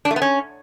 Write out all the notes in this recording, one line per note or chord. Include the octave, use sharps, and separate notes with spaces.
D4
A3
B3
C#4